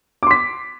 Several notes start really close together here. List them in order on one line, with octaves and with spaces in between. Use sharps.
D6 C6 B6